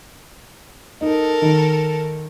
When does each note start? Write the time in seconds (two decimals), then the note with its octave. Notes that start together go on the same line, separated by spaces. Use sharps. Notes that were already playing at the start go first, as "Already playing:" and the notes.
1.01 D#4 A4 A#4
1.42 D#3